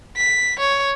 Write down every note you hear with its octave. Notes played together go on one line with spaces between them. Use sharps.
B6
C#5